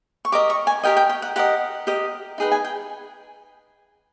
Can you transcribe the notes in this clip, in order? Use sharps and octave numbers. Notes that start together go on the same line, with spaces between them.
C#6
G4 A#4 D#5 D6
C#6
G#5
G4 A#4 D#5 G5
G5
G5
F#5
G4 A#4 D#5 F#5
G4 A#4 D#5
D#4 G#4 B4 G5
G#5
G5